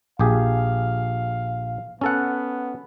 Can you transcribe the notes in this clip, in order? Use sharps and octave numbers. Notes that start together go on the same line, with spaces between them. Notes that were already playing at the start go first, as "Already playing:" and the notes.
A#1 G4 G#4 F5
B3 C#4 A4 F#5